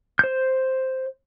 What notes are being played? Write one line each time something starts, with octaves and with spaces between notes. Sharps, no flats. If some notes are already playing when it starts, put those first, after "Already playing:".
C5 G6